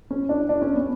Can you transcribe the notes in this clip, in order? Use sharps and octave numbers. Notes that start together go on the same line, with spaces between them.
C#4
D4
D4
C#4
B3